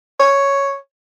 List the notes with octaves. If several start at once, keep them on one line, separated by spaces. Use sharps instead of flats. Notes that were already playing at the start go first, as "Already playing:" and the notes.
C#5